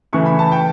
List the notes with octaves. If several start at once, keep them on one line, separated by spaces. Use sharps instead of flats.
C#3 E3 A3 E4 C#6
B5
A5
G5